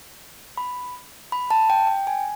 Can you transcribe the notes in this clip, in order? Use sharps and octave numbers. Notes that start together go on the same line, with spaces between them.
B5
B5
A5
G5
G5
G#5